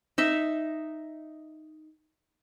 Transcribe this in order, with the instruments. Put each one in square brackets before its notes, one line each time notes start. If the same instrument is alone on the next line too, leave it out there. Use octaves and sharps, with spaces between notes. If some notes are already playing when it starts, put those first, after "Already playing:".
[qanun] D#4 E5